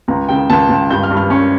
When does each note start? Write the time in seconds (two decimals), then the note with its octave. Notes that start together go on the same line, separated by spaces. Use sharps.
0.08 C#2 A#5
0.29 C#3 G5
0.50 C#2 A5
0.69 C#2
0.90 G2 G6
1.03 F6
1.11 G2
1.17 F6
1.30 C#4 C#6